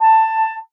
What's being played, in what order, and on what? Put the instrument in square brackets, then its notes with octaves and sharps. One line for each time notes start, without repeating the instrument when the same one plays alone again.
[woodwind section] A5